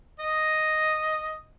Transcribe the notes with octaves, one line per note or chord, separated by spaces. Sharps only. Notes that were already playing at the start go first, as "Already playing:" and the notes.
D#5